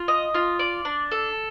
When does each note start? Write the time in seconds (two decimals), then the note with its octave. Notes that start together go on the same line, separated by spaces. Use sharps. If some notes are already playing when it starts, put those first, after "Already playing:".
Already playing: F4
0.08 D#5
0.34 F4
0.59 D5
0.85 D4
1.12 A4